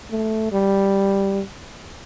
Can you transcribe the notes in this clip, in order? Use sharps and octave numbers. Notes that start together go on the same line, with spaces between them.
A3
G3